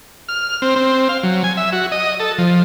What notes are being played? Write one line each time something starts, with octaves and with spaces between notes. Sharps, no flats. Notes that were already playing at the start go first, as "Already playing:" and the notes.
F6
C4
C4
F5
F#3
G#5
E5
F#4
D#5
A4
F3